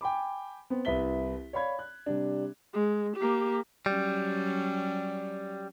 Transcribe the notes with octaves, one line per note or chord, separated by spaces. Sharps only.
G5 G#5 B5 D6
B3 C4
C2 E4 B4 E5 B6 G7
C#5 D5 F5 B5 G#6
F#6
C3 G3 D4
G#3
A#3 G4
F#3 G3 C#4